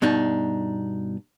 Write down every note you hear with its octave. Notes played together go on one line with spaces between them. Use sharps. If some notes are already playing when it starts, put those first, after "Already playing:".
G2 B2 D4 D#4